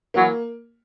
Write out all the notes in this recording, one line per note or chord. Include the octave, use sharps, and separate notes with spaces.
E3 F#3 A#3